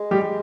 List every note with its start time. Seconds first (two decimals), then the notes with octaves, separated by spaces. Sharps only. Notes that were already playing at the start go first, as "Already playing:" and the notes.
Already playing: G#3
0.11 G3 G4